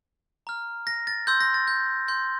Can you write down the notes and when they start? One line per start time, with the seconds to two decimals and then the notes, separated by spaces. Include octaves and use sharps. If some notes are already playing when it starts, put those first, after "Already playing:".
0.47 A#5 F6
0.87 A#6
1.07 A6
1.27 C6 E6 G6
1.40 A#6
1.54 A6
1.68 G6
2.08 C6 G6